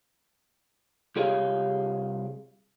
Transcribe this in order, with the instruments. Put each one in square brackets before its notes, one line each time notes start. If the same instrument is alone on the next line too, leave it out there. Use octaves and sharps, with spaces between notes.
[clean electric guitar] C2 G4 G#4 C#5 D#5 F5